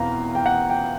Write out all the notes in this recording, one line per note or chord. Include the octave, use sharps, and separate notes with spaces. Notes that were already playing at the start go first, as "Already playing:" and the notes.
Already playing: E2 B2 C4 F5 A#5
G5
F#5
G5